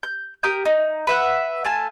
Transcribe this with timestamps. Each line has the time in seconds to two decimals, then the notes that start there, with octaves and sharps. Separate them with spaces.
0.03 G6
0.43 G4 A#4 D#6 G6
0.65 D#4
1.07 B4 E5 F#5
1.65 A3 F4 G#5 A5